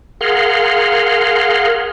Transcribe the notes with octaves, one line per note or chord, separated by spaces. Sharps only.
G#4 A#4 F5 F#5 C6